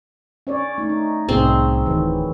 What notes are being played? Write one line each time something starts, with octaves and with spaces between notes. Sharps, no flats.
C#4 C#5 D5
A3 D#4
D#4
C2 A2 C3 C4 C#4 D#4 G#4
D1 D#3 E3 F#3